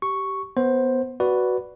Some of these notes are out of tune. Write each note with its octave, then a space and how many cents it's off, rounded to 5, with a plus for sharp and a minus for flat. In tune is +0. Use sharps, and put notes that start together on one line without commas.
G4 -15 C#6 +0
B3 +0 C5 +10
F#4 +5 B4 +0 D5 +0